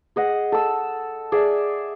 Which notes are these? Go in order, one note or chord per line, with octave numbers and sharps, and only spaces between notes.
G#4 D#5 F#5
A4 E6
G#4 D5 E5